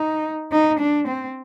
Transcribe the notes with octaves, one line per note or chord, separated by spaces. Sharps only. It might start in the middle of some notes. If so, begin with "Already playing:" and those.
Already playing: D#4
D#4
D4
C4